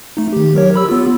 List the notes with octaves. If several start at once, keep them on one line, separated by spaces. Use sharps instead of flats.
A3 D#4
D#3 G4
F#3 A#4 C#5
G4 B5 E6
B3 F4